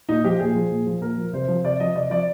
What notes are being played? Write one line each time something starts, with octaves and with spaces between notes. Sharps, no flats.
A#2 D#4
F3 G4
A#2 G#4
F3
A#2
F3
A#2 A#4
F3
C3 C5
F3
C3 D5
F3 D#5
C3 D5
F3 D5